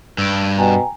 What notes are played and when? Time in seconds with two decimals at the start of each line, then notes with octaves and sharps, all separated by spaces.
0.18 G2 E6 D7
0.58 B2 G5 G#5 A#5